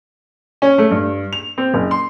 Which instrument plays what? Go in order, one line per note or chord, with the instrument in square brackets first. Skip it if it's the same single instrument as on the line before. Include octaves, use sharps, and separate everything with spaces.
[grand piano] C#4
A3
G2
F7
C4
F#1
C6